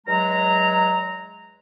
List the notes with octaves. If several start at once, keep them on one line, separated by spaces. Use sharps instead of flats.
E2 F#3 G#3 A#5